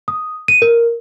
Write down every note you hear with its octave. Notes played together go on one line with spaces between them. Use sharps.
D#6
D#7
A#4